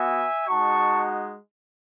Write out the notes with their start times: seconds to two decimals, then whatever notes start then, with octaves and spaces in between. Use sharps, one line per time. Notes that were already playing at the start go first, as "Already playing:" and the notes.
Already playing: B3 F#4 E5 G#5
0.48 G#3 D#4 F#4 A5 C#6